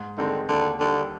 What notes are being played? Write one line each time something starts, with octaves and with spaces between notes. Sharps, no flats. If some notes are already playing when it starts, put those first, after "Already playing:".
Already playing: G#2
D3 D#3 G#3 C4 D#4
D#2 D3
D3 D#3 G3